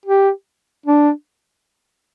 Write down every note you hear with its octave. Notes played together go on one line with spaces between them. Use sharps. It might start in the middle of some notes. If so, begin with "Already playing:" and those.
G4
D4